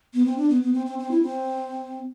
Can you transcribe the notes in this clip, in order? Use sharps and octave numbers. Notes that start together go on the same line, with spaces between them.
B3
C4
D4
B3
B3
C4
C4
C4
E4
C4